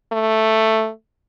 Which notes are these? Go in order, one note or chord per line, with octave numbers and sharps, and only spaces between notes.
A3